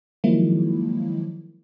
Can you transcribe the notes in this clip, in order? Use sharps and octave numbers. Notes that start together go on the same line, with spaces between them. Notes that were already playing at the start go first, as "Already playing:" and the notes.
D#3 F3 F#3 G#3 A#3 E4